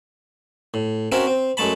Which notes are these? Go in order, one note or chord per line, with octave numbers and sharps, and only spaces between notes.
A2
C4 C#4 F#4 A#4 E5
C4
F#2 G#3 A3 A5 B5